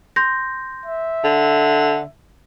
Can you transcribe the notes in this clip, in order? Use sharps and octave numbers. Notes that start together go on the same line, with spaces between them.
C6 G6 A#6
E5
D3